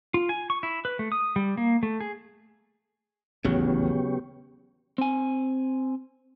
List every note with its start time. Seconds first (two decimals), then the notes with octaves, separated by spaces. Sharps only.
0.14 F4
0.29 G#5
0.50 C#6
0.63 E4
0.85 B4
0.99 A3
1.12 D#6
1.36 G3
1.57 A#3
1.83 A3
2.01 G#4
3.45 D#1 A1 E2 C#3 F#3 B3 G4 C#5
4.98 C4 G#5